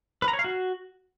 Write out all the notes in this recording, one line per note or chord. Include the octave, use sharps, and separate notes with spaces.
B4
A#5
C#5
F5
F#4